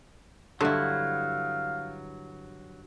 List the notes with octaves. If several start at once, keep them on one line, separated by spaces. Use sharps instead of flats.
G2 D3 F#3 E4 F5